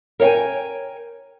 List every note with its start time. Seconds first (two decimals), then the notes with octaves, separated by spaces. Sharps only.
0.20 A#4 C#5 D#5 G5 G#5